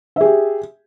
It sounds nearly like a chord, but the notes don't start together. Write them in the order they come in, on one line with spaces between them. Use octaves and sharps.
E5 G#4 G4